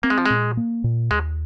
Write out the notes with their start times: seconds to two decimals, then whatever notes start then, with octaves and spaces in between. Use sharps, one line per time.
0.03 A#3 C4
0.10 G#3
0.18 F3
0.26 A#2 G#3
0.57 A#3
0.84 A#2
1.11 D#2 G#3